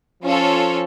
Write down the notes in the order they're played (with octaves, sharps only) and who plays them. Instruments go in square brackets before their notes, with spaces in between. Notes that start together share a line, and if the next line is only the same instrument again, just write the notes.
[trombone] F3 [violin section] C#4 F4 A4 C#5